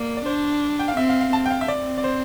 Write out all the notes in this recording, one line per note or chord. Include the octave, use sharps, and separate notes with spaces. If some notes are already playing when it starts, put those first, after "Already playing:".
Already playing: A#3 D5
D5
D4 C5
G5
F5
C4 E5
F5
F5
A5
G5
F5
E5
C4 D5
D5
C5